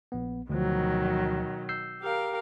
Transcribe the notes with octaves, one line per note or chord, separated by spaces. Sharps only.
A#1 B3
D2 B2 D#3 F3 F#3
E6 G6 C7
G4 A#4 F5